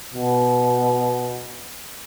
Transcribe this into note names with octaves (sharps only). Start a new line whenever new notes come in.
B2